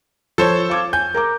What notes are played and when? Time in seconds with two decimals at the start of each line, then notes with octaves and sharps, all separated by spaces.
0.38 F3 A4 C5 C#5
0.70 F5 D6 G#6
0.93 G#5 G6
1.14 A#4 A#5 D6